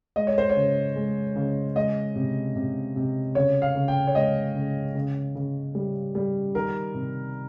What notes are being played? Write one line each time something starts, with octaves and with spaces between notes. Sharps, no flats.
G#3 D#5
C#5
C5
C#5
C#3
G#3
C#3
G#3 D#5
C3
C3
C3
C#3 C#5
F5
C#3
G5
C#5
G#3 D#5
C#3
C#3
C#3
G3
G3
D#3 A#4
C3